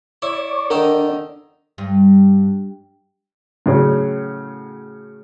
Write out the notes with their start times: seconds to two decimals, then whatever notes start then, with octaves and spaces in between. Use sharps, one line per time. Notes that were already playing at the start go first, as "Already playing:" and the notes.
0.22 E4 C#5 D5
0.70 D3 D#3 D4 D#4 A#4
1.78 G2
3.66 A2 C#3 F#3 C#4